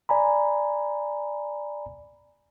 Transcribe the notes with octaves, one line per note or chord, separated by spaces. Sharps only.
D5 G#5 A#5 B5